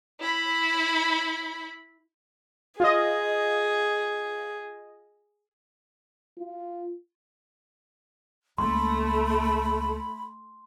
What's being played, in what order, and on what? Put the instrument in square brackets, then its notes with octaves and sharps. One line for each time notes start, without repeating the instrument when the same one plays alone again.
[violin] E4 B5
[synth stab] F4 D#5 [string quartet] G#4
[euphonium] F4
[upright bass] C#2 A#3 [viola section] A3 [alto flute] B5 [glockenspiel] C6